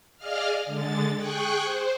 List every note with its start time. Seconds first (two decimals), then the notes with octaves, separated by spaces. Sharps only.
0.17 G#4 D5 D#5 F5 F6
0.66 D3 G#3 A6
1.14 G#4 G5 C#6 F#6
1.64 C5